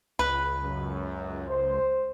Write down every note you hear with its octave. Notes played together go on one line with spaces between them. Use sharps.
C#2 B4
F#2
C5